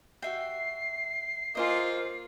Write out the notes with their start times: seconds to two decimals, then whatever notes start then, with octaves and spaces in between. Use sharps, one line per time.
0.22 F#4 E5 G5 C7
1.55 A#3 F4 G#4 C5 D#5